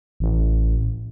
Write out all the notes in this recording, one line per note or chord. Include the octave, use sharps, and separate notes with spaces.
A1